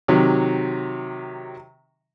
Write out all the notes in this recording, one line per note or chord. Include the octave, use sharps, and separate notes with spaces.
C3 D#3 F#3